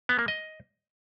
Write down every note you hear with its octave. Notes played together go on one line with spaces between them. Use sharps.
B3
A#3
D#5